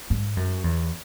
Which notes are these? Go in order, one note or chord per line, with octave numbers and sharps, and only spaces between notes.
G#2
F#2
E2